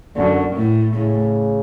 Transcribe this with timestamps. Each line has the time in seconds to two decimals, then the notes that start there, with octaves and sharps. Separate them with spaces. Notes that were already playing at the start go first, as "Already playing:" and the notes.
0.16 F#2 D3
0.55 A2
0.94 A2 C#3